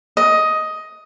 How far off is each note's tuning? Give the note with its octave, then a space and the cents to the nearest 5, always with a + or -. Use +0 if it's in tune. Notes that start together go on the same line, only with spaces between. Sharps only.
D#5 +10